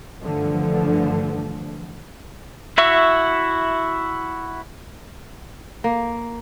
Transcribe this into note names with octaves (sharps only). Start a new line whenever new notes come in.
F#1 G2 D3 E3 F3 A3
E4 F#4 E5 C#6
A#3